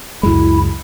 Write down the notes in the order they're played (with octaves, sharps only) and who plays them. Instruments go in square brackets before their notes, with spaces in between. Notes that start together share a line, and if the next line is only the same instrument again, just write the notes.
[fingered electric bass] C#2 F#2 G#3 [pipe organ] E4